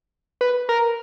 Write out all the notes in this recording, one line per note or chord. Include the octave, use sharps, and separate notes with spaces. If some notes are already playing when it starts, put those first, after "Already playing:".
B4
A#4